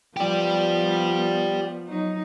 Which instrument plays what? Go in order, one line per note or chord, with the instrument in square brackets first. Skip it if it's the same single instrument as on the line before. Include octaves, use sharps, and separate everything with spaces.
[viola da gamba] F3 B3 [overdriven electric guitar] G4 D5
[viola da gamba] F#3 D#4